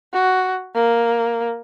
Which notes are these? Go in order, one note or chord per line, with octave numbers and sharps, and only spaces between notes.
F#4
A#3